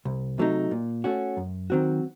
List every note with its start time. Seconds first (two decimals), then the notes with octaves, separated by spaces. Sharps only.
0.05 C2
0.38 C3 F#3 A3 D#4
0.71 A#2
1.04 A3 C#4 F#4
1.37 F#2
1.70 D#3 F#3 C4 F#4